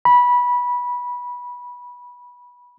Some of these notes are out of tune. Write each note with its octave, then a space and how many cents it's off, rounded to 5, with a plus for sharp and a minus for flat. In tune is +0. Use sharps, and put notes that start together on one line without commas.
B5 -15